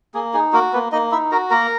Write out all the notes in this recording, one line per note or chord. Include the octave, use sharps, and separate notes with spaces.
A#3 G#4
D#4 G#4
A#3 F#4 A#4
A#3 B3 B4
A#3 D#4 D#5
D#4 E4 E5
F#4 A#4 A#5
A#3 A#4 A#5